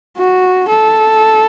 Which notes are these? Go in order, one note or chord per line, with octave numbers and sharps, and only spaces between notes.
F#4
A4